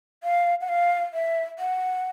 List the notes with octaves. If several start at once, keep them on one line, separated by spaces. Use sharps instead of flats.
F5
F#5
F5
E5
F#5